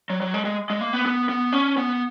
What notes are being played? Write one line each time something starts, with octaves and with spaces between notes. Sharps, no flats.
F#3
F#3
G#3
G#3
G#3
A#3
B3
B3
B3
C#4
B3